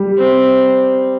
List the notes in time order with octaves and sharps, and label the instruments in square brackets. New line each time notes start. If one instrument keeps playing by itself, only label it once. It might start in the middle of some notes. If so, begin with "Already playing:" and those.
Already playing: [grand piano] G3
[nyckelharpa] C4